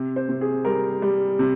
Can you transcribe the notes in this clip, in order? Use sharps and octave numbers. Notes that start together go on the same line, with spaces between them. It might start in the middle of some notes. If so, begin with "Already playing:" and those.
Already playing: C3
C5
C3
G#4
G3 A#4
G3
C3